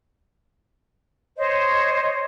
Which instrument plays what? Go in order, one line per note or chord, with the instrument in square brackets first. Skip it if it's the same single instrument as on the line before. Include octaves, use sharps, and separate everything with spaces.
[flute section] C5 C#5 D#5